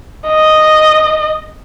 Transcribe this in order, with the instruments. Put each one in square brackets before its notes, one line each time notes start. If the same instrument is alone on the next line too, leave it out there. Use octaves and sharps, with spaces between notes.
[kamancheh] D#5